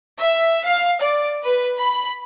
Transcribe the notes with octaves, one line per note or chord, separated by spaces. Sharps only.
E5
F5
D5
B4
B5